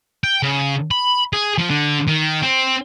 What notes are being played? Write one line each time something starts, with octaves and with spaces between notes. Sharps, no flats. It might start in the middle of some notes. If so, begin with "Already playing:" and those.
G5
C#3
B5
G#4
F3
D3
D#3
C4